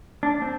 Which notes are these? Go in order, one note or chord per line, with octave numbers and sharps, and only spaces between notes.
D4
C4